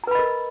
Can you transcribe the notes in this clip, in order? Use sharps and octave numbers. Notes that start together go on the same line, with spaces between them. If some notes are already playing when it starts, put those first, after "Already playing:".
A#4 B4 D#5 A#5 B5